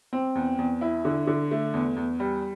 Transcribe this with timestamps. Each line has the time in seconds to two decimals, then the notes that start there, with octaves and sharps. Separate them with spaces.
0.13 C4
0.35 E2
0.59 E2
0.81 E4
1.05 D3
1.27 D3
1.51 A3
1.74 E2
1.97 E2
2.20 G3